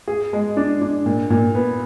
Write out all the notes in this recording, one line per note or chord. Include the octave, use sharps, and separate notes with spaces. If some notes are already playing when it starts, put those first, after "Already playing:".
G#4
G#3
D4
D4
A#2
A#2
B3